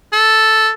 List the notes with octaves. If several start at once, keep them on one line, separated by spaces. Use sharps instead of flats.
A4